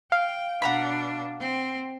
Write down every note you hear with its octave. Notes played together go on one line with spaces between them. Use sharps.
F5 G5
B2 D4 F#5 A#5 B5
C4